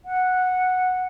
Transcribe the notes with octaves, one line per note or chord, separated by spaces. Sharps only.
F#5